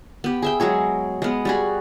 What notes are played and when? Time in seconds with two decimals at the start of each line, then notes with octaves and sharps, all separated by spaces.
0.24 B3 G4
0.42 G#4 E5 G5
0.60 F#3 G#3 G#4 C#5
1.22 G#3 B3
1.45 G3 F#4 G#4